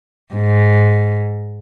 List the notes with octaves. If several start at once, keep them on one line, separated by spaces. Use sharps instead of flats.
G#2